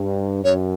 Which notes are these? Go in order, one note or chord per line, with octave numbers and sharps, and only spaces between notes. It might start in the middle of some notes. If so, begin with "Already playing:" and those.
Already playing: G2
F#2 C#5